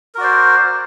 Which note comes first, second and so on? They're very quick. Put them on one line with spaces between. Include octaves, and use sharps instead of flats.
A#4 F#4 D5 C5